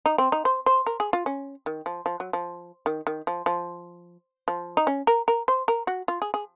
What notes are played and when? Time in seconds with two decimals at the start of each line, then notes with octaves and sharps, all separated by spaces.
0.06 D#4
0.18 C4
0.32 D#4
0.45 C5
0.66 C5
0.86 A#4
1.00 G#4
1.13 F4
1.26 C#4
1.66 D#3
1.86 F3
2.06 F3
2.20 F#3
2.33 F3
2.86 D#3
3.07 D#3
3.27 F3
3.46 F3
4.48 F3
4.77 D#4
4.87 C#4
5.07 A#4
5.28 A#4
5.48 C5
5.68 A#4
5.87 F#4
6.08 F4
6.22 G#4
6.34 G#4